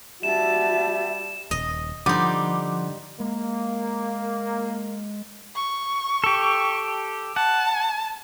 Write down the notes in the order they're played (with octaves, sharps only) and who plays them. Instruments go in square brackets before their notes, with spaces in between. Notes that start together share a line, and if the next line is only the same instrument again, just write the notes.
[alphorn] G3 [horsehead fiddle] F#4 A5 [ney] E5 [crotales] E7
[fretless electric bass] D#1 [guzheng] D#5
[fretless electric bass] D3 [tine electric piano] F3 F#5 C6 [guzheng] G3 D#4 [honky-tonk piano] D6
[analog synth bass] G#3 [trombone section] A#3
[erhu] C#6
[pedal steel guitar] G4 A4
[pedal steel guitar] F#5 [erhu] A5